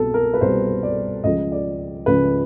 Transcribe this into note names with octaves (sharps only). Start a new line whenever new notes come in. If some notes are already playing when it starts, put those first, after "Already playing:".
Already playing: C2 B2 A4
A#4
B4
C2 B2 C5
D5
C#2 C#3 F3 D#5
D5
C#2 C#3 F3 B4